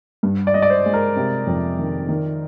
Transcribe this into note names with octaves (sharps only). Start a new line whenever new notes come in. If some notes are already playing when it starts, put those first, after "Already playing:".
G2
D5
G2 D#5
D5
C5
G#3
A#4
C3
F2
D#3
D#3